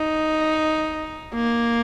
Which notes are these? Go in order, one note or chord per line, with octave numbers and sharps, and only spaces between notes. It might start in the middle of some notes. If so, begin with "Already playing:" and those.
Already playing: D#4
A#3